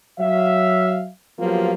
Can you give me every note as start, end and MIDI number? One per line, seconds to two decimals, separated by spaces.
0.19 1.09 54
0.19 1.09 76
0.19 1.09 77
1.39 1.73 53
1.39 1.73 54
1.39 1.73 58
1.39 1.73 59
1.39 1.73 65
1.39 1.73 67